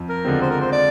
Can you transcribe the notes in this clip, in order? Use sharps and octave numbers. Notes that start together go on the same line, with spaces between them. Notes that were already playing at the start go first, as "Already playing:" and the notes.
Already playing: F2
A#4
D3 F3 G#3 C4
C5
A#4
C5
D5